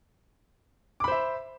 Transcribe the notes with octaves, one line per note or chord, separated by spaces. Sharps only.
C5 E5 B5 D6